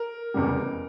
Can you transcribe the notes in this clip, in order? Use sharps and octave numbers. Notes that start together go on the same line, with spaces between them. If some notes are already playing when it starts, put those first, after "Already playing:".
Already playing: A#4
F1 E2 C#3 G3